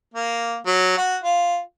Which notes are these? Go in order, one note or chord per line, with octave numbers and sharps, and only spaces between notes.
A#3
F#3
F#4
F4